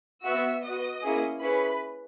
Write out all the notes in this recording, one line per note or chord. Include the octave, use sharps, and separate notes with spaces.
B3 F#4 E5 E6
B3 F#4 D#5 D#6
A#3 C#4 E4 G#4
C#4 E4 G#4 B4 B5